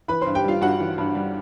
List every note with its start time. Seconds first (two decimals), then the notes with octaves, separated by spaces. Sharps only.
0.08 E3 B4 B5
0.21 G2 C5 C6
0.35 G4 G5
0.44 G3 F4 F5
0.61 G2 F#4 F#5
0.80 E3
0.98 G2
1.15 G3